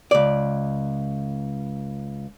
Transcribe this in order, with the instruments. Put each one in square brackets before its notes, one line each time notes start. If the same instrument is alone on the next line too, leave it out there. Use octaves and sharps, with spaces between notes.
[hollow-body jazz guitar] C#2 D5